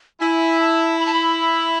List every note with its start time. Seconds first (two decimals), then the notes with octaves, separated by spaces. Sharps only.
0.20 E4 G#5
0.60 A5
0.99 B5
1.06 A5
1.14 B5